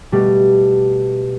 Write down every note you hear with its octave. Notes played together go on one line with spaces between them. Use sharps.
B2 G3 A3